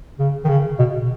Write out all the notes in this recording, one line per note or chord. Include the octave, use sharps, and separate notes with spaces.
C#3
D#3
C#3
B2